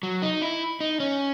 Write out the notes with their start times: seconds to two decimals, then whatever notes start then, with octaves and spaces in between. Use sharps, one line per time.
0.03 F#3
0.22 D#4
0.42 E4
0.80 D#4
1.00 C#4